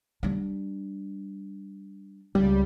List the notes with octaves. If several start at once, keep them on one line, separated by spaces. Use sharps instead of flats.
G3 D4
C#2 G3